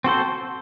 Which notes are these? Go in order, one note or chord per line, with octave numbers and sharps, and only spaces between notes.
C4 F#4 A4 C5